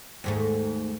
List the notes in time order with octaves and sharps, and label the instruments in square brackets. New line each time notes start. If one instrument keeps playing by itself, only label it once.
[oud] D#2 G#2 A3